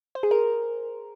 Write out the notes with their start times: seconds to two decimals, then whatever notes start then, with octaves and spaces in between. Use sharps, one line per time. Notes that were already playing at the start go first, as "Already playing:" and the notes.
0.15 C5
0.23 G#4
0.31 A#4